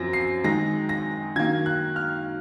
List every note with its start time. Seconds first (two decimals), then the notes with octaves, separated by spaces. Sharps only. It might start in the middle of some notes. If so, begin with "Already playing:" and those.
Already playing: F#2 F3 C4 A#6
0.13 C7
0.44 D#3 G#3 D#4 A#6
0.89 A#6
1.36 D#3 F#3 A#3 G#6
1.66 F#6
1.96 F6